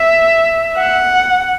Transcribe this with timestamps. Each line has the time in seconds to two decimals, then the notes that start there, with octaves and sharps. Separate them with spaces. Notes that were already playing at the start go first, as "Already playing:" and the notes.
Already playing: E5
0.78 F#5